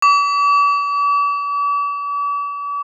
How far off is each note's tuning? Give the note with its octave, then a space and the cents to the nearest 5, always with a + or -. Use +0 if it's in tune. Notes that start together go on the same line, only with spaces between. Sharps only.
D6 -45